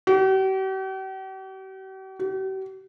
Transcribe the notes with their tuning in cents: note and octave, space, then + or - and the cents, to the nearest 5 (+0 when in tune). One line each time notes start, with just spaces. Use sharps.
G4 -45
G4 -45